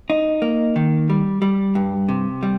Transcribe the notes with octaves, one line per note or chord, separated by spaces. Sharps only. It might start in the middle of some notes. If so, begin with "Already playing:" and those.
D#4
A#3
D#3
G3
G3
G2
C3
G3